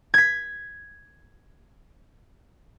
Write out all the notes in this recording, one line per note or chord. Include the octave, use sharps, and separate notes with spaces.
G#6 B6